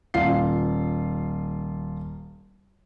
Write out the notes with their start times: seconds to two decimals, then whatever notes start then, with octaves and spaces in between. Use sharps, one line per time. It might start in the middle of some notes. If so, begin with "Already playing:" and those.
0.14 D#1 F4 C7